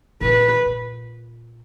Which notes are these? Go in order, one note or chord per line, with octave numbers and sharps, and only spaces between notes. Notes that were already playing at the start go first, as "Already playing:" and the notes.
A#2 B4
A#2